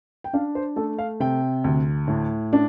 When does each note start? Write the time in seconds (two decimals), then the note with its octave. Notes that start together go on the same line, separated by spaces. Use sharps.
0.24 G5
0.33 D4 F5
0.55 C5
0.76 A3 A4
0.98 F5
1.20 C3 G5
1.64 D2
2.08 A2
2.53 D4